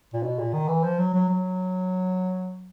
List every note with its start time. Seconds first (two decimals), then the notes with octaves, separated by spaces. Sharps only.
0.14 A#2
0.23 B2
0.39 A#2
0.53 D#3
0.68 E3
0.83 F3
0.99 F#3
1.13 F#3
1.29 F#3